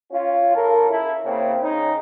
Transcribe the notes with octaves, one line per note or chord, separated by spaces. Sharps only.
C#4 F4
C#3 A4 A#4
E4
C#3 A#3 C4
C#3 D#4